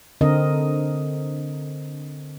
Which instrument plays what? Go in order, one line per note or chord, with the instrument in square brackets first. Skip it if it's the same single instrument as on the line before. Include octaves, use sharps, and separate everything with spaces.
[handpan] D3 C4 A#4 D#5